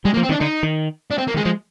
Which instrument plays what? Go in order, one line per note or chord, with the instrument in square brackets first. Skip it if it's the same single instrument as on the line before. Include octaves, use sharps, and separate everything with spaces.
[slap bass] G3 [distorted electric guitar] G#3
[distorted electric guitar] A#3
[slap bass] F3
[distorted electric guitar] C4
[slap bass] D#3
[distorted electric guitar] D4
[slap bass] D3 [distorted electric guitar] D#4
[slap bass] D#3
[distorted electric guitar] D4
C4
A#3
[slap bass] D#3 [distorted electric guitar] G#3
[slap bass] F3 [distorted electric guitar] G#3